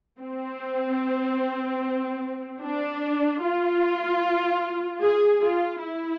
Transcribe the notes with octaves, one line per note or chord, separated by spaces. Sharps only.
C4
D4
F4
G#4
F4
E4